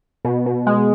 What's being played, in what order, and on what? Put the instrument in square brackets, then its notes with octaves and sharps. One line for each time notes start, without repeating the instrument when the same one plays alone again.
[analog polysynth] B2
B2
G#3